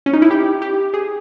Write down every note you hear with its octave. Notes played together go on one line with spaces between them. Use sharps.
C#4
D#4
E4
G4
G4
G#4